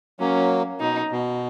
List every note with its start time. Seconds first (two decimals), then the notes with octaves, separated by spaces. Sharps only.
0.20 F#3 A#3 C#4
0.80 B2 D#4
1.12 B2